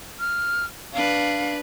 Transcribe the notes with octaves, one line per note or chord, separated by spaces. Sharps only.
F6
D4 B4 F5